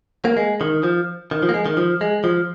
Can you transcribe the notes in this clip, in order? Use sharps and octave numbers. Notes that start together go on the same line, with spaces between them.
A#3
G#3
D#3
F3
D#3
F3
A#3
G#3
D#3
F3
G#3
F3